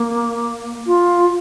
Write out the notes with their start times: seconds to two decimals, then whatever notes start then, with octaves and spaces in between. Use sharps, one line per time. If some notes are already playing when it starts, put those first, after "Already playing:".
Already playing: A#3
0.87 F4